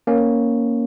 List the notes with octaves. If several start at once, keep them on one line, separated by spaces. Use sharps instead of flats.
A#3 C#4